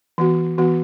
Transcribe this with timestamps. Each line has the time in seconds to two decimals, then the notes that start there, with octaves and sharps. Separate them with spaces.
0.18 E3 B3 F#4
0.58 E3 B3 F#4